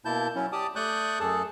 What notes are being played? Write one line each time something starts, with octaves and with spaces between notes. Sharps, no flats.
B2 A#3 E4 A5 G6
F#3 C#4 E4
G4 D5 A5 D6 D#6
A3 D5 C#6 D#6 F#6 G6
F#2 G#4 A4 A5